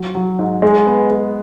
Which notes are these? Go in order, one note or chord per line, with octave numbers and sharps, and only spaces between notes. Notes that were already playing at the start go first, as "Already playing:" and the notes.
Already playing: F#3
F#3
G#2
G#3
B3
G#3